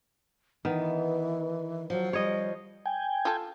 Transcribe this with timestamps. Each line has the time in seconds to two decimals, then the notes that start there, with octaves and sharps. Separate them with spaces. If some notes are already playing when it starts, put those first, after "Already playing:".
0.65 D#3 E3 B3
1.90 F3 F#3
2.13 G3 C#5 D#5
2.86 G5 G#5
3.25 F4 A4